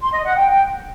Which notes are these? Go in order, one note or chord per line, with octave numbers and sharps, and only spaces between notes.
C6
D#5
F#5
G5